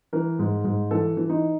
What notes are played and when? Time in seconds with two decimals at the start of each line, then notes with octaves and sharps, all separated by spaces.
0.13 E3 A#4
0.39 G#2
0.65 G#2
0.91 E3 A4
1.17 E3
1.29 D#4